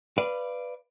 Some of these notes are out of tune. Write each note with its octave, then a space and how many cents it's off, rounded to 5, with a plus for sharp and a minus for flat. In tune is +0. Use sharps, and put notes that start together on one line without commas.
B4 +0 D5 +0 F5 -25